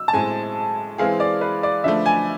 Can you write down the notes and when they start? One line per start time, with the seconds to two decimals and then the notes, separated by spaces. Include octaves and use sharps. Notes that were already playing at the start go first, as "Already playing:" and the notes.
Already playing: E6
0.08 A5
0.13 A2 G#3 C4 G#5
0.98 E3 G#3 C4 E4 G#4 F5
1.20 D5
1.41 B4
1.63 D5
1.84 D3 F3 A3 E5
2.06 G#5